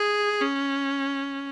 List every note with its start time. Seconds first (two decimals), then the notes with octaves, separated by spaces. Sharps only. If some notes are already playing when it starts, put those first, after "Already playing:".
Already playing: G#4
0.41 C#4